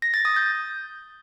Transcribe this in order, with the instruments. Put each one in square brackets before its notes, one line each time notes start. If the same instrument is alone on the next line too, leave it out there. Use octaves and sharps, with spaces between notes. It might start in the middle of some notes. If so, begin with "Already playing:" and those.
[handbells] A#6
A6
D#6
G6